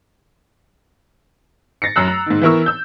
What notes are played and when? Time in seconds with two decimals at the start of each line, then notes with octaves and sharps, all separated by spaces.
1.82 A6 A#6 C7 C#7
1.96 F#2 A#5 E6 F#6
2.08 A#5
2.26 G#2 D#3
2.42 E3 B3 E4 A#4 C#6 E6
2.66 E6 G6